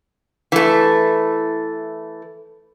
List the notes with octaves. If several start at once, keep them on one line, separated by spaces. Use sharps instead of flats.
E3 A3